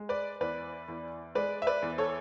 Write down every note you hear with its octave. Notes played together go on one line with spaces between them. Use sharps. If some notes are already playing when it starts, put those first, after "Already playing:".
Already playing: G#3
B4 D5
E2 B4 D5
E2
G#3 B4 D5
E5
B4 D5
E2
A4 C#5